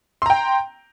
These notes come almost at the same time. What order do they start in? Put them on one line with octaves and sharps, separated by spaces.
C6 A#5 G5